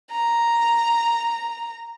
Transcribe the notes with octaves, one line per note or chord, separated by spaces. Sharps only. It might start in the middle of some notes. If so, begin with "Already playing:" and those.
A#5